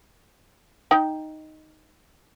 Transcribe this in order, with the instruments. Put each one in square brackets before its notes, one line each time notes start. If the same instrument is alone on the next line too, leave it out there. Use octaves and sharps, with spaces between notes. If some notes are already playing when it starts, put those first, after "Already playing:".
[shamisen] D#4 G5